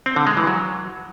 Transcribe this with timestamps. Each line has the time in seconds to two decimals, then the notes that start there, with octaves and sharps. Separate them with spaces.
0.06 C4
0.16 D3
0.27 G#3
0.37 E3
0.47 F#3